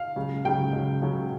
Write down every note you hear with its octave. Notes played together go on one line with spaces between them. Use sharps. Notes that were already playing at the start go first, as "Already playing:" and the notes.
Already playing: F5
C#2 C#3 F#3
C#2 C#3 F#3 G5
C#2 C#3 F#3
C#2 C#3 F#3